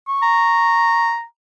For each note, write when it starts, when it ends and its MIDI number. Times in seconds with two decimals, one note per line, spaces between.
0.08 1.13 85
0.22 1.24 82